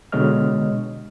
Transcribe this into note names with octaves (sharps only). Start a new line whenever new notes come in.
B2 D3 G#3 C#5 D#5 F6